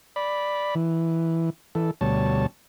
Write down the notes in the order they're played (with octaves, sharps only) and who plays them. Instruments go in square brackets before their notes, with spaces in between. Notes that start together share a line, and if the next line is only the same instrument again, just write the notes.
[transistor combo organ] D5 B5
E3
E3 A4
D2 B2 G3 C#5 A5